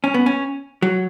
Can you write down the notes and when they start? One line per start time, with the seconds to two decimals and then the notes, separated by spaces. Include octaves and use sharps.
0.04 C#4
0.14 B3
0.26 C#4
0.82 F#3